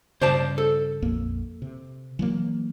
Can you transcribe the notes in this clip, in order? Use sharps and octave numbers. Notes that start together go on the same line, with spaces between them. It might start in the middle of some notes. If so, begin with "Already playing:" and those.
G2 C#3 C5 D5 A5
A4
A#1 F2 A#3
C3
E3 F#3 A#3